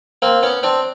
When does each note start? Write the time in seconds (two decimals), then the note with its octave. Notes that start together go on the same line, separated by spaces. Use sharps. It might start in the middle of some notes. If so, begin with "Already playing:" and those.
0.22 A#3 C4
0.43 B3 C#4
0.63 C4 D4